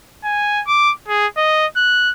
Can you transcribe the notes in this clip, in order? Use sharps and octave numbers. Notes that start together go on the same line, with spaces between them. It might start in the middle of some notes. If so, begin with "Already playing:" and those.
G#5
D6
G#4
D#5
F#6